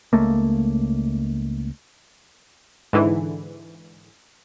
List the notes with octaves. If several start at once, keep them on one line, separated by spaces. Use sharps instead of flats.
C#2 A3 A#3
G#2 D3 E3